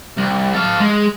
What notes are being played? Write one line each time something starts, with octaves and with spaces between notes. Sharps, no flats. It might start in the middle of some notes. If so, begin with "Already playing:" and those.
C2
A4 F5
G#3